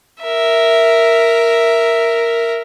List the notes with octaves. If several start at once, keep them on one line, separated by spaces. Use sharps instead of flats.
A#4 E5